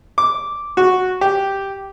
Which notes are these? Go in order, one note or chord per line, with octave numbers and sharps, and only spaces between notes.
D6
F#4
G4